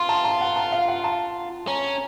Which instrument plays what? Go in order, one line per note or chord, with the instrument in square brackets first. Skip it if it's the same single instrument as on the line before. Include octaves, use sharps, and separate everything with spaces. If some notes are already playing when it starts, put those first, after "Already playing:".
Already playing: [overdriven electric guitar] F4 [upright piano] C6
[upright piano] A5
A5
F#5
A5
F5
F#5
A5
[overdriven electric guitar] C#4 [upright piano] A#5